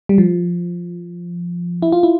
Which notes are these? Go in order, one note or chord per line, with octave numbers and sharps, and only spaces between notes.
G3
F3
E4
F4
E4